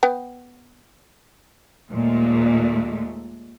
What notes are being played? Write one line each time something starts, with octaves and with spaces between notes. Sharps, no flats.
B3 G5
D#2 A#2 G#3 A3